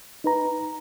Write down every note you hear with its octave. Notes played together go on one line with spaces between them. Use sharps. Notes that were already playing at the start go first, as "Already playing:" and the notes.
D#4 B4 A#5